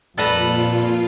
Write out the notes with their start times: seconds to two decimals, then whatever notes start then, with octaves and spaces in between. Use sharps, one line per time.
0.18 F2 A#2 G3 F4 A4 B4 A#5